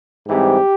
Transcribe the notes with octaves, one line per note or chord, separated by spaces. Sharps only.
G#2 E3 G3 C4 G4